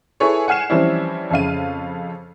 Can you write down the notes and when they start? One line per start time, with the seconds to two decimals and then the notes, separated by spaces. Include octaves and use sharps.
0.20 E4 G#4 A4 B4 C#5
0.48 F#5 G#5 F6 C7 E7
0.70 E3 F3 G3 C4 C#4 E4
1.31 F2 C#3 F5 D#7